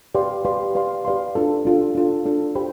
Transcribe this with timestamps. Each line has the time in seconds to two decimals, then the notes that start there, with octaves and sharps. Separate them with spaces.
0.15 G4 B4 D5 F5 C6
0.45 G4 B4 D5 F5 C6
0.75 G4 B4 D5 F5 C6
1.05 G4 B4 D5 F5 C6
1.35 D4 F4 A4
1.65 D4 F4 A4
1.95 D4 F4 A4
2.25 D4 F4 A4
2.55 G4 C5 G5 B5